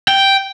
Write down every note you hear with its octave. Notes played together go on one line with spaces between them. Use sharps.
G5